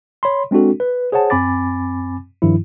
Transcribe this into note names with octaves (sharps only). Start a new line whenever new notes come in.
C#5 B5 C6
G#3 C4 D4 F#4 A4
B4
G#4 C5 C#5 F#5 A5
F#2 C4 G#5 B5 D6 A6
G2 D#3 F3 E4